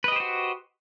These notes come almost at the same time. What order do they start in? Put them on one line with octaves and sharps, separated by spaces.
B4 D#5 G4 C5 F#4